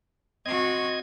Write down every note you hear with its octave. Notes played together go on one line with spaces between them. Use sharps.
C4 F#4 D#5 G#6